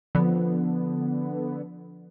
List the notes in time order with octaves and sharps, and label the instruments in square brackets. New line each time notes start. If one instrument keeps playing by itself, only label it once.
[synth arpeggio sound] D3 B3 [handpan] F3